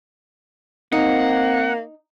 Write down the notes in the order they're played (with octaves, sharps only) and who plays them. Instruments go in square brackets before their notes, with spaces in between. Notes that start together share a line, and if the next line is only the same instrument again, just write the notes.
[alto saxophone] A#3 [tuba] C4 [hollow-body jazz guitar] D#4 [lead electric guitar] F#5